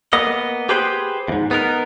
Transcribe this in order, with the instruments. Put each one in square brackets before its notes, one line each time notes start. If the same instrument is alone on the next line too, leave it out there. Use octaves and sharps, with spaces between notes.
[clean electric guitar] A#3 B3 D#5
G4 G#4 B4 C5 G5
E2 G#2
B3 D#4 A#4